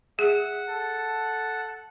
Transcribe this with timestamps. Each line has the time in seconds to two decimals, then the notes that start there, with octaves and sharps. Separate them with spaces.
0.19 G#4 E5 F#5
0.69 A4